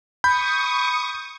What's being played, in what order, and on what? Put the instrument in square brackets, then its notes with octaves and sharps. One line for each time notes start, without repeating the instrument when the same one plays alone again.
[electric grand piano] B5 G6 [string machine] C#6 D#6